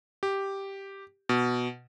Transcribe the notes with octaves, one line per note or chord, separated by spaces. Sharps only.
G4
B2